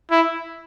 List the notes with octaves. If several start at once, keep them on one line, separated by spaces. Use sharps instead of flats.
E4